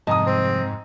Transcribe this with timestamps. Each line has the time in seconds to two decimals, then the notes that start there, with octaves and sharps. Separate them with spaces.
0.07 C2 F2 G#2 D#5 A5 A#5 D#6
0.27 C4